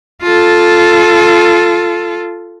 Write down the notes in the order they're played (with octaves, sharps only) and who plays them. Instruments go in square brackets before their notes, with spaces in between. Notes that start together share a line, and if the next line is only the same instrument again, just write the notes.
[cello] F4 A4